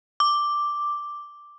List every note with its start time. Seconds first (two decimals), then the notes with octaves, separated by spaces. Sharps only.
0.20 D6